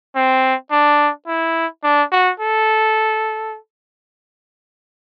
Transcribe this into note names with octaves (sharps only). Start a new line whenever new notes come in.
C4
D4
E4
D4
F#4
A4